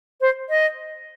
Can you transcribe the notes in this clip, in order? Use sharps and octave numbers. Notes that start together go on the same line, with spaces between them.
C5
D#5